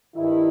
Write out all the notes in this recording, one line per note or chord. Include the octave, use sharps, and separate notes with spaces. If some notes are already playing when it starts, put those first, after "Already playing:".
G2 D#3 E4